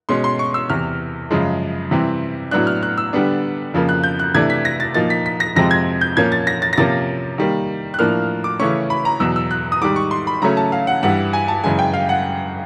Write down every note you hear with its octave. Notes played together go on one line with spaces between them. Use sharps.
B2 G#3 C#4 C6
C6
C#6
E6
E2 C3 E3 F6
F#2 C#3 F3 G#3
C3 E3 G3 C4
A2 F#3 B3 D4 F#6
F6
F#6
E6
D3 G3 B3 D4
F2 C#3 F3 A#3
F#6
G6
F#6
C3 E3 A3 D4 G#6
B6
A#6
A6
A#2 F3 A#3 D#4 A6
B6
B6
A#6
F2 C3 F3 G#3 C4 A#6
G#6
G6
A#2 F3 A#3 C#4 G#6
A6
A#6
A6
A#6
C3 F3 A#3 C#4 A6
D#3 G3 A#3
F#6
A2 F3 A#3 D4 F6
D6
C#3 E3 A3 C#4 C#6
B5
A#5
E2 B2 F#3 E6
E6
F#6
D#6
G#2 D#3 G3 D6
C#6
C6
B5
C#3 F#3 A3 C#4 A#5
A5
F5
F#5
G2 E3 G3 F#5
G#5
A5
F#2 C#3 E3 G#3 G#5
G5
F5
F#5